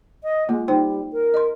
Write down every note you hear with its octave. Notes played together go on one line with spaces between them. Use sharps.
D#5
G#3 A#3 F4
G3 D#4 C5 G5
A#4
D#5 C6